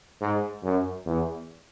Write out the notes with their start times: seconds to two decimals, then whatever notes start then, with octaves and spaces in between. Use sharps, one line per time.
0.21 G#2
0.63 F#2
1.06 E2